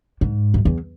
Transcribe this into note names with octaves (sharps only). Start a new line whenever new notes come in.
G#2
F#2
E2